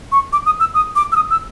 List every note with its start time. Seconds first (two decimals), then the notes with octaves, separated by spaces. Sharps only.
0.12 C#6
0.33 D6
0.46 D#6
0.60 E6
0.74 D#6
0.96 D6
1.12 E6
1.16 D#6
1.30 E6